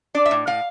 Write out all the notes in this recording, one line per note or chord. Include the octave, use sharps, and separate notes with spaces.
D4 D5
E5
A2
A2 F5